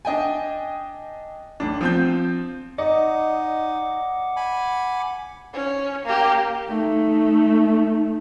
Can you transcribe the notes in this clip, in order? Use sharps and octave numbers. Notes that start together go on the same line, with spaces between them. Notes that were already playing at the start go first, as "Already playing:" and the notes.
D4 D#5 G5 G#5
A1 D4
F3 C4 G6
D#4 D5 D#5 F#5 D6
G#5 B5
C#4
A#3 G4
A3 D#4